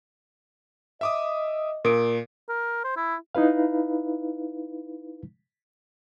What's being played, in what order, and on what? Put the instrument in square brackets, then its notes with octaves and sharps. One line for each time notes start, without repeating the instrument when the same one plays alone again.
[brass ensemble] D#5 [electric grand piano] E5 D6 D#6
[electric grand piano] A#2 [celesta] A#4 D7
[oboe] A#4
C5
E4
[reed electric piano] D#4 E4 B4 F5